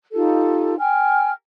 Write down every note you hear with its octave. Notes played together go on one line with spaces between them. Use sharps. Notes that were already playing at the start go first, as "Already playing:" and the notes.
D#4 F4 G4 A4
G5 G#5 F6